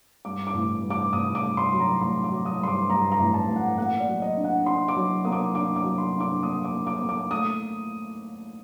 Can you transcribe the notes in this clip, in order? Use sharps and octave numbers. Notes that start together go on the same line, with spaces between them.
G2 D6
D6
A1
G2
D6
A1 D#6
D6
G2
C6
F#3
A#5
A1 C6
D6
F#3
D#6
G2 C6
D6
G2 A#5
A#5
A1
A5
A1
F#5
A#3 F#5
D5
F#3
D#5
D4
F#5
D4 C6
D6
F#3
A#3 D#6
D6
D4 D6
D6
F#3
C6
D4
D6
A#3 D#6
D6
A#3
D6
A#3
D6
A3 D#6